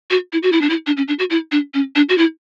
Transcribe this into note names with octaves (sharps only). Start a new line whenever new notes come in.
F#4
E4
F#4
E4
D4
E4
D4
C#4
D4
F#4
E4
D4
C#4
D4
F#4
E4